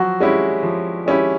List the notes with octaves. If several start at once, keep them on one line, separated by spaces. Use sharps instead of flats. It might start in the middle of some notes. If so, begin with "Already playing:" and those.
Already playing: F3 F#3 F#4
G#3 C#4 E4 G4
F3
G#3 C#4 E4 G4